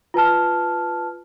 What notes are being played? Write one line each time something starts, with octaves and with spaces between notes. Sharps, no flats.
F4 B4 A5 F6